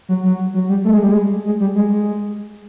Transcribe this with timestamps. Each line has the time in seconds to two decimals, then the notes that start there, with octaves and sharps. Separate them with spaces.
0.09 F#3
0.23 F#3
0.54 F#3
0.69 G3
0.85 A3
0.93 G#3
1.03 G3
1.12 G#3
1.45 G#3
1.60 G3
1.75 G#3